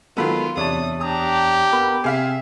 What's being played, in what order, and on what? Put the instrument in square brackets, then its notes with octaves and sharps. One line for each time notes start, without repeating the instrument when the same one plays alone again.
[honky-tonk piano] D#3 F#3 B3 [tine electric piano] G#3 A4 B5 [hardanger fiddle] F4
[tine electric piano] E2 C#5 A5 [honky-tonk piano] C3 D4 [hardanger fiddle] D#6
[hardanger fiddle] D4 A#5 [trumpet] G4 [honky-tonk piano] D#6
[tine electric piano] B3 A#4 [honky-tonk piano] B5
[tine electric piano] C3 G5 [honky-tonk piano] G#4 F5 B6 [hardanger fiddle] E5